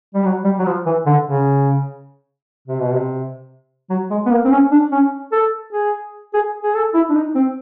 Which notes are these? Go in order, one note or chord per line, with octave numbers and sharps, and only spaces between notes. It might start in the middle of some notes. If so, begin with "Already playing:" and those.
G3
F#3
G3
F#3
F3
E3
D3
C#3
C3
B2
C3
F#3
G#3
B3
A#3
C4
C#4
D4
C#4
A4
G#4
G#4
G#4
A4
E4
D4
D#4
C4